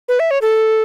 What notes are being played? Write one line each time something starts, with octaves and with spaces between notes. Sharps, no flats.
B4
E5
C#5
A4